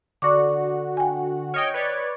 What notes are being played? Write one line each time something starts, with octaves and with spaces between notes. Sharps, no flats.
D3 F#4 D5 C#6 D6
G5 G#5
C#5 D#5 G5 D#6 F6
B4 C#5 D5